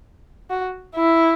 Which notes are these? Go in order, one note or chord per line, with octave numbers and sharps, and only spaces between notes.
F#4
E4